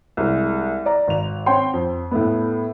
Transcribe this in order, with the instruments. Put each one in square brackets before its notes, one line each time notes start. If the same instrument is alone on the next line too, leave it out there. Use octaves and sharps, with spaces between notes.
[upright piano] C2 G#3
D5 A#5
G#1 F7
C4 C#5 G5 C6
F2
A2 A3 B3